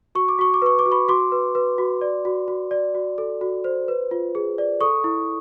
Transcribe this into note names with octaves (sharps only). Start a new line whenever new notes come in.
F#4 C#6
D6
F#4 C#6
D6
B4 C#6
D6
F#4
B5 C#6
F#4 C6 D6
B4
B4
F#4
D5
F#4
F#4
D5
F#4
A4
F#4
C5
B4
F4
G#4
D5
A4 C#6 D#6
E4